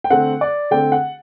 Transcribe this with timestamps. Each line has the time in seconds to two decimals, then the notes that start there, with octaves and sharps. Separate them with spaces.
0.04 G5
0.10 D3 A3 C4 F#5
0.41 D5
0.71 D3 A3 C4 G5
0.92 F#5